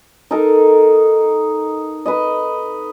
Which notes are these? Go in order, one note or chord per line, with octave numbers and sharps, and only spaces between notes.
D#4 A4 A#4
B4 D#5